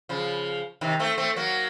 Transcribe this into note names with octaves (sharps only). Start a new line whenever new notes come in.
C#3 F3
C3 D#3
A3 C4
A3 C4
F#3 A#3